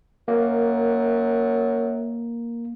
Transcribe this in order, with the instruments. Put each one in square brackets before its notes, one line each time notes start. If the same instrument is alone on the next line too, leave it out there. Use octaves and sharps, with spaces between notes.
[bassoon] F#2 [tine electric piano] A#3